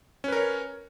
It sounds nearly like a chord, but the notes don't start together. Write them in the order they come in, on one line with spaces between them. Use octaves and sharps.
C#4 B4 A#4 C#5